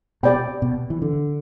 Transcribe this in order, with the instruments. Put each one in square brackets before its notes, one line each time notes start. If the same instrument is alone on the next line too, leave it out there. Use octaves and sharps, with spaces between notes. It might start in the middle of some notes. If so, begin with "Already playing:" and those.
[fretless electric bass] B2 [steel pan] G4 D5 G5 B5
[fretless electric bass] B2
E3
D3